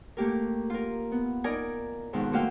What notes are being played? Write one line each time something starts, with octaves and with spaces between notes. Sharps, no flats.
A3 A#3 G4 A#4
F4 A#4
B3
D#4 A#4 D5 D#5 G#5
F2 G#2 B2 D#3
A3 A#3 F#4 E5 F5 G5